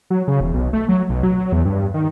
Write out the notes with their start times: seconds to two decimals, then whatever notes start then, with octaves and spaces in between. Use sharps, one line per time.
0.10 F#3
0.28 C#3
0.41 E1
0.54 B1
0.73 A3
0.88 F#3
1.09 B1
1.23 F#3
1.52 E2
1.65 G2
1.94 D#3